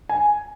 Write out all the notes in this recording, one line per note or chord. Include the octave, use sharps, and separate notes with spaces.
G#5